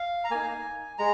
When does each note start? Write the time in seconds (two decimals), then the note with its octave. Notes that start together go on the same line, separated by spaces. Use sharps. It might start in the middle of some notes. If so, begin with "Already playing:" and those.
Already playing: F5
0.24 A#5
0.31 A#3 D#4 G#5
0.98 G#3 A#5